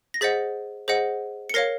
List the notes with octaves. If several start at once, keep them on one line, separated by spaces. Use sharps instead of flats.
A#6
G#4 C5 D#5 F#5 A6 B6
G#4 C5 D#5 F#5
C#7
A#4 C#5 F5 A#6 C7